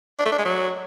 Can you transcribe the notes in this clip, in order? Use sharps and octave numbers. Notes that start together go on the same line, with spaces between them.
D4
A3
D4
G#3
F#3